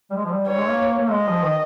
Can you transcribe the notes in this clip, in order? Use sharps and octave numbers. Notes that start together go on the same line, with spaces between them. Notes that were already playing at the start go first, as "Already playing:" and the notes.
G3
G#3
F3
G3
G3 C#5
G#3
A#3
A#3
G#3 D#5
F3
D#3